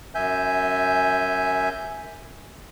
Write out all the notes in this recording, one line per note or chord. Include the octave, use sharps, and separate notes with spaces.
F#2 E5 G#5 G6